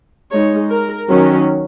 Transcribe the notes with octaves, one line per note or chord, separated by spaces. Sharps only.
G#3 D#4 C#5
A#4
D#3 F#3 C#4